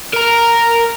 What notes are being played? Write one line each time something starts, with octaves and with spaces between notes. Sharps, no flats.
A#4 A#5